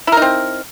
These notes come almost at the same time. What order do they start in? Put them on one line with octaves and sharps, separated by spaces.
E4 A#4 D#4 C4